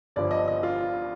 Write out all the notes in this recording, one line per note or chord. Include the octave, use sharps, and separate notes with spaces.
G1 G2 D3 F3 D5
D#5
D#5
F4